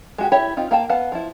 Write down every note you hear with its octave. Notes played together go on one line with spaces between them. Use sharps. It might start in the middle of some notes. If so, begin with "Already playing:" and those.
G#3 F#4 G4
E4 G4 C#5 E5
C4 D#4 F4
A#3 F5 G5 A5
B3 B4 F5 F#5 A5
F3 E4